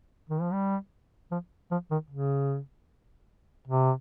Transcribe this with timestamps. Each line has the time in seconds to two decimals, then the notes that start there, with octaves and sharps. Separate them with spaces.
0.30 D#3
0.42 F3
0.53 G3
1.32 F3
1.71 F3
1.91 D#3
2.10 C#3
3.68 C3